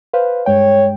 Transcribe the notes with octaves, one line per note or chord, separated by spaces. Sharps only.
B4 C5 F5
G2 G#3 C#5 G5